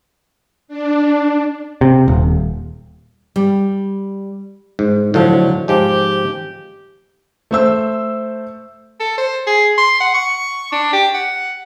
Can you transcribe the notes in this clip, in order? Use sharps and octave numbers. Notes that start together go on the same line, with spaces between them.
D4
C3
D#1
G3
G#2
A2 D3 F3 F#3
G#2 F3 G#3 G4
A3 C5 E6
A4
C5
G#4
C6
F#5
C#6
D4
G4
F#5